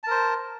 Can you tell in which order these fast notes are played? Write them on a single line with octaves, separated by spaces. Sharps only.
A5 A#4 C5